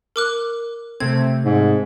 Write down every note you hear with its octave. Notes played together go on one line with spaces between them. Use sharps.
A#4 D6 F#6
C3 A3 C4 G#6
G#2 G#3